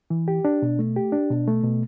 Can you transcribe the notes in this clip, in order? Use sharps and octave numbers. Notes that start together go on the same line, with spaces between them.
E3
G4
D4
B2
A3
G4
D4
B2
A3
B2